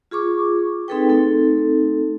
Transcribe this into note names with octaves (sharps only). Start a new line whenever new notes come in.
F4 G#4 C#6 D6
C4 D#4 G#4 A4 B4 G5
A3 C4 D#4 A4